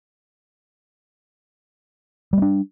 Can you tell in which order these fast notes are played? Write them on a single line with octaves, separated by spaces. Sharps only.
G3 A3 D4